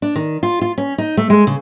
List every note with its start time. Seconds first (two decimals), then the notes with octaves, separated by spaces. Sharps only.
0.02 D4
0.16 D#3
0.43 F4
0.62 F4
0.78 C#4
0.98 D#4
1.17 A3
1.30 G#3
1.47 C#3